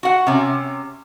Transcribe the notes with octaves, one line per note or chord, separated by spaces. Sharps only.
F#4 F#5
C3 C#4